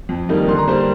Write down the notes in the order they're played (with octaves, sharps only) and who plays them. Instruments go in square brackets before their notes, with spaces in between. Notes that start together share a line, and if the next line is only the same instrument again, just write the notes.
[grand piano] F2
D#3 G3 A#3 D#4
D3 C6
A#5
G3 A#3 C5 C6